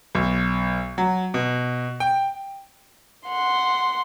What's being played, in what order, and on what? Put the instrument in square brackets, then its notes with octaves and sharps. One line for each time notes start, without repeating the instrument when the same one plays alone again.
[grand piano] B1
F#3
B2
G5
[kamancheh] F#5 C6